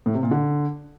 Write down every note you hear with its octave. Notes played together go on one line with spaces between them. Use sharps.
A2
C3
A#2
D3